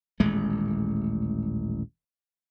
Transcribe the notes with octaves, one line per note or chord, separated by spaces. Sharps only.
D#1 A1 G#3 A3